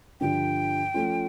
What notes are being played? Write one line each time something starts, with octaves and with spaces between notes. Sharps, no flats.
G2 D3 F3 G5
F3 A3 C#4 F4